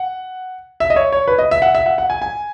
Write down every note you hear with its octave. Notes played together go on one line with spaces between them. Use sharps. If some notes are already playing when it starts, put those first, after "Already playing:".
Already playing: F#5
E5
D#5
C#5
C#5
B4
D#5
E5
F#5
E5
F#5
F#5
G#5
G#5